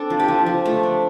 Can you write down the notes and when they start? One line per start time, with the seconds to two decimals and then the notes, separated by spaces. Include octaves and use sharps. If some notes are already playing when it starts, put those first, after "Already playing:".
Already playing: C4 D4 A4
0.10 F3
0.20 G4
0.28 F3
0.46 F3
0.65 A3
0.83 D4